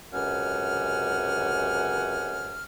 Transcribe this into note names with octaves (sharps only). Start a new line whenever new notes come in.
C#2 F#2 C3 F#5 G#5 F6